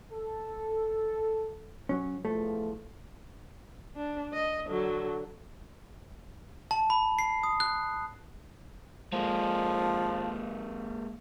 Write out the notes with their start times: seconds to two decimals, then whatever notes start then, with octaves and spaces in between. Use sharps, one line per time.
0.12 A4
1.89 F#3 C#4
2.25 E2 F3 A3
3.96 D4
4.33 D#5
4.67 D3 F#3
6.71 A5
6.90 B5
7.19 C7
7.43 D#6
7.60 F#6
9.13 F3 G#3 A#3